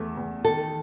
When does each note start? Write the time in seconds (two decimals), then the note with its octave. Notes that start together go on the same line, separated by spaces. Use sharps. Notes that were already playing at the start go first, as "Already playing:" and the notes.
Already playing: E2 A3
0.17 E2
0.44 D#3 A4